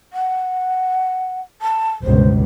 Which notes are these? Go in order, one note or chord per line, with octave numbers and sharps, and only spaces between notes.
F#5
A5
G1 C#2 B2 C5